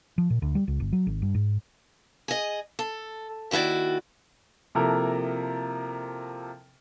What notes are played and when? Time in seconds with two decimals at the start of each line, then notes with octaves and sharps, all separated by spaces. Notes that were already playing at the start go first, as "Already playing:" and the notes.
0.18 F3
0.30 A#2
0.42 D2
0.55 G3
0.68 C#2
0.80 G1
0.92 F#3
1.07 G#1
1.22 G2
1.35 G#2
2.28 G#4 D#5
2.79 A4
3.51 D#2 D#3 E4 F#4 D5
4.75 C3 F3 A#3 E4 A4 A#4